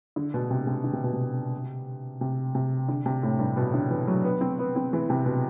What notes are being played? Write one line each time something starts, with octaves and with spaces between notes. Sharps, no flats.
D3
B2
C3
C3
D3
C3
B2
C3
C3
C3
D3
C3
A2
G2
B2
D3
E3
F#3
B3
C4
B3
C4
E3
C3
B2